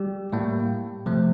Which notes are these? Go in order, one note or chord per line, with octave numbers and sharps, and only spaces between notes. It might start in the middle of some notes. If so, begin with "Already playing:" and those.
Already playing: G3 G4
A2 G3 A#3
C3 F3 A3